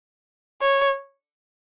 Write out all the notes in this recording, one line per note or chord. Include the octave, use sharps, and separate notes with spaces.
C#5